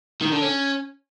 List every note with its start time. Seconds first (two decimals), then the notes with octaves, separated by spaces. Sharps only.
0.21 D#3
0.32 D3
0.42 C#4